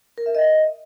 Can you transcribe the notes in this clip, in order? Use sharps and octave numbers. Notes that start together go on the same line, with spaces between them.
A#4
E5
D#5